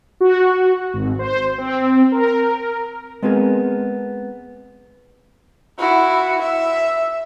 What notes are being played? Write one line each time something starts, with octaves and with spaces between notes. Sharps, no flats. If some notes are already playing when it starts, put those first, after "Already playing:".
F#4
G#1
C5
C4
A#4
G#3 B3 C4 G#4 A#4
E4 F#4
E5